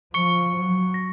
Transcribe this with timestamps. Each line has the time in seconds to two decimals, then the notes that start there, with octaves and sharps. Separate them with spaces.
0.14 F3 C#6 C#7
0.57 F#3
0.94 A#6